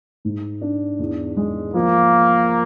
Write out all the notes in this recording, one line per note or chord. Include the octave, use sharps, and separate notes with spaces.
G#2
D4
E2
G#3
F3 A#3